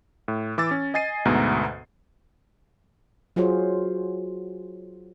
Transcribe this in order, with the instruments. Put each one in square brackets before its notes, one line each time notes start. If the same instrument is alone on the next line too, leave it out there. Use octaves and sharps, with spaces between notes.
[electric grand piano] A2
E3 D6 E6 A6
C#4
D#5 G#5 A6 C7 D#7
D2 G#2 B2 B3 A#5
[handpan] F#3 F4 F#4 G#4 C5 C#5